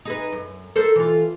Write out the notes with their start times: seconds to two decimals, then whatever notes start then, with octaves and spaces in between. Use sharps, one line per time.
0.05 D#4 G#4 B4
0.32 F#2
0.76 A4 A#4 C5
0.96 E3 F4